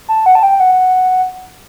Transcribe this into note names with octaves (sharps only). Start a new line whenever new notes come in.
A5
F#5
A5
G5
F#5